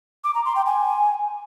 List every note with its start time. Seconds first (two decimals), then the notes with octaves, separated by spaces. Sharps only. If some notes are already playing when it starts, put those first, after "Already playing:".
0.24 D6
0.35 A#5
0.45 C6
0.56 G5
0.66 G#5